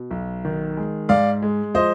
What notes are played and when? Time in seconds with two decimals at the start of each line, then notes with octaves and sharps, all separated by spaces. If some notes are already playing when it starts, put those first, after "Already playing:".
Already playing: B2
0.11 B1
0.45 D#3
0.77 G#3
1.09 G#2 D5 F5
1.42 G#3
1.74 F3 C5 D#5